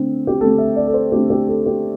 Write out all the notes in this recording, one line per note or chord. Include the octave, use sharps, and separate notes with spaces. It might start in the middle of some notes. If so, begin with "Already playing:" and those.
Already playing: D3 A3 C4
G4
D3 A3 C4 A4
E5
D5
A4
C5
D3 A3 C4 G4
G4
A4
G4